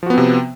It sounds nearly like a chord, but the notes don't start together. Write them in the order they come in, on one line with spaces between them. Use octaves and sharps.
F3 F#4 B3 C4 C3